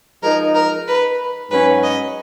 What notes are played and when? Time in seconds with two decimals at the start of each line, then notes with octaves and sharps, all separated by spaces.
0.23 F3 G#3 D#4 A#4
0.55 A#4
0.88 B4
1.51 G#2 F#3 C#4 B4
1.83 D#5